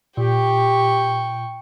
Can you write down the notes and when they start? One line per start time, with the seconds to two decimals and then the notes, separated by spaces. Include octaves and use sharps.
0.17 A#2 G4 G5 C#6